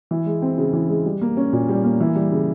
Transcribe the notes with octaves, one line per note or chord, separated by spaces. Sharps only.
E3
G#3
C4
C#3
E3
G#3
G3
A#3
C#4
A#2
G3
A#3
E3
G3
C#3